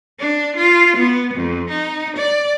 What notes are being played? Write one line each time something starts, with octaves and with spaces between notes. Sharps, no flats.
D4
F4
B3
F2
D#4
D5